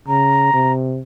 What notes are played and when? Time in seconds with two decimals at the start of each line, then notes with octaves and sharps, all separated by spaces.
0.08 C#3 A#5
0.54 C3